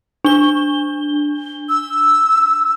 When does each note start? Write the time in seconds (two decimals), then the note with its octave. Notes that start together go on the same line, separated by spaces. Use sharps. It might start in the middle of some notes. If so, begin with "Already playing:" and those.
0.25 D4 G7
1.69 E6